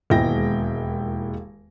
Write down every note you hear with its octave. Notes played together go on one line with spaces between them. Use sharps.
E1 D#2 G#3 E4 G5 A#6